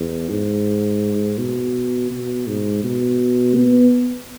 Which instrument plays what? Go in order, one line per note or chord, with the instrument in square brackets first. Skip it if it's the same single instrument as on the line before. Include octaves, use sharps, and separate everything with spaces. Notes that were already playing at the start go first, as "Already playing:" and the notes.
Already playing: [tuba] E2
G#2
B2
B2
G#2
B2
B3